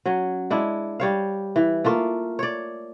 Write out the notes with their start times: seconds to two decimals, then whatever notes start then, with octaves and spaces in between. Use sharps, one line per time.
0.05 F#3 C#4
0.50 G#3 D4 E4
1.00 G3 C#5 F5
1.56 E3
1.84 A3 A#3 F4
2.39 C#5 D5